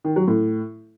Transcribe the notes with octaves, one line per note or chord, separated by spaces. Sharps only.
D#3
F#3
A2